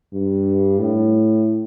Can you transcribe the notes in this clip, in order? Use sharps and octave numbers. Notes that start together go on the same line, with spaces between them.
G2
A2